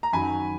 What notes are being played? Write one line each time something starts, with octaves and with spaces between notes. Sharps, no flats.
A#5
F#2 D#3 F#3 G#5 B5